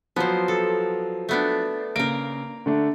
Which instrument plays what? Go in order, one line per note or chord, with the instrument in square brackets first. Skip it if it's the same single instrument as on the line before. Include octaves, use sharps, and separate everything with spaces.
[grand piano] F3 F#3 [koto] B3 C5
[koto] A4
A3 B3 D4
[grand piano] C#3 D7 [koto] A#3 A#4
[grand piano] D3 A3 D4